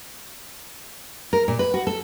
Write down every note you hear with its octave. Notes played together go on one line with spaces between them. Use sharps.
A#4
A#2
B4
F#4
A4